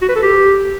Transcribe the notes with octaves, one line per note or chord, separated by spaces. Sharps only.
F#4
B4
A4
G4